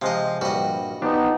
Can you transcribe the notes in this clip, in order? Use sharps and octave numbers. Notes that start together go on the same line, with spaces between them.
C3 F3 G#3 D#5
A#1 G2 G3 F#4 D#5
F3 B3 D4 D#4 G4